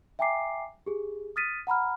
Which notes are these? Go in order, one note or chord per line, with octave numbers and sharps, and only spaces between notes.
E5 G5 G#5 A#5 D6 C7
G4 G#4
D#6 F6 A6 B6 D#7
F#5 A#5 B5 F6